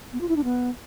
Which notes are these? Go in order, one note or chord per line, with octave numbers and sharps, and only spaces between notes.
B3
F4
E4
D4
B3